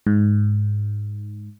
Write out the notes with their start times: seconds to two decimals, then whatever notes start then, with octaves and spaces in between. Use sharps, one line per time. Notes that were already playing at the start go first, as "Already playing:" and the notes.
0.07 G#2